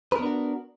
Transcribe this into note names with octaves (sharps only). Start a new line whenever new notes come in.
B3 D4 F#4 A#4 B4